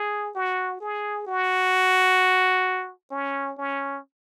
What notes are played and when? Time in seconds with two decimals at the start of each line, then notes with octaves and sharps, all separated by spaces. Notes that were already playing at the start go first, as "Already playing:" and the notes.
Already playing: G#4
0.36 F#4
0.81 G#4
1.27 F#4
3.11 C#4
3.58 C#4